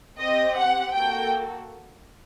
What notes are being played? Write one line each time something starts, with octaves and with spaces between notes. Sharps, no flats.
C4 G4 D#5
F#5
A#3 F#4 A4 G5